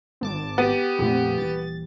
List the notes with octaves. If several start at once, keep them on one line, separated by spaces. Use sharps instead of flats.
G#1 A5 D6
B3 G4
F2 A#2 A3
D#1 E3 A6